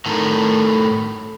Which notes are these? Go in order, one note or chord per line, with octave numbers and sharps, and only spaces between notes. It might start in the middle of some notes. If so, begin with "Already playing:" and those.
A2 D#3